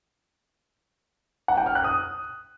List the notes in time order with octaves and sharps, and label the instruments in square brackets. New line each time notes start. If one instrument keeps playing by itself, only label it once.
[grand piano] F#5
G5
F6
F#6
D#6